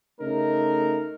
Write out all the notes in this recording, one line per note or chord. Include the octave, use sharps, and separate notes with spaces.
C#3 A3 D#4 A#4